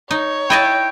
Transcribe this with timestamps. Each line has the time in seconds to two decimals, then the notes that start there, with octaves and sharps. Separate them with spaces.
0.11 D#4 C#5
0.50 E4 D#5 G5 A5